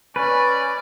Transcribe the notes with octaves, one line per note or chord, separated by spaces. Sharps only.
C#4 B4 D5